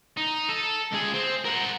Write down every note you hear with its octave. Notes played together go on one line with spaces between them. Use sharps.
D#4
A4
C#2 G#4
C4
A#4 F#5